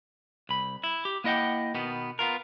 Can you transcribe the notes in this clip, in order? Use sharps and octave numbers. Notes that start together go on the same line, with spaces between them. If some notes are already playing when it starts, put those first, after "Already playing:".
C2 B5
E4
G4
A#3 E4 D#5 F#5 G5
B2 D#3 B3
B3 F4 A#4